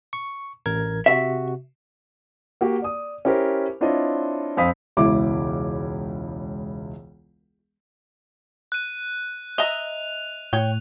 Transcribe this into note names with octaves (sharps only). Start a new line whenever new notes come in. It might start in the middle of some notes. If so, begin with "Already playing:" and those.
C#6
A1 A#4 G#6
C3 F#4 E5
A#3 F#4 G4
D5 D#6
C#4 E4 G4 A#4 C5
C4 D4 E4 F4 C#5 D#5
F2 C4 F5 B5 D#6 B6
E1 C#2 E4 D6
F#6 D#7
D#5 E5 A#5 F7
A2 C#5 G5